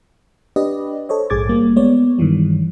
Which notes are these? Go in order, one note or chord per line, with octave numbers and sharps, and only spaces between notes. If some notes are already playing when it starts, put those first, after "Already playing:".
D4 G4 B4 D5 D#5
A4 C5 C#5 D#5
A#1 G#2 G#4 D6 G#6 A6
G3 A#3
G#3 B3 C#5 D5
G2 D#3 E3 G3